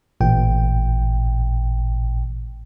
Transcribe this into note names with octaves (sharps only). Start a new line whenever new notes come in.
A1 A#2 G5